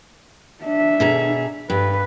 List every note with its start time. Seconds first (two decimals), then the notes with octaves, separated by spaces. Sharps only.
0.63 D4 E5
1.00 B2 G#4 A#5
1.70 G2 B4